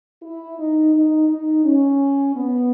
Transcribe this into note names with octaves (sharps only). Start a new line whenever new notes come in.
E4
D#4
D#4
D#4
C#4
B3